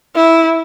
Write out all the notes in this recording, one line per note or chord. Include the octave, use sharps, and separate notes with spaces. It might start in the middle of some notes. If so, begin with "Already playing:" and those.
E4